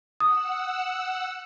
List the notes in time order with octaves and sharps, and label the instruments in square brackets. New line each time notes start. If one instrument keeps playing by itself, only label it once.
[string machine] F#5 E6 [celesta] D#6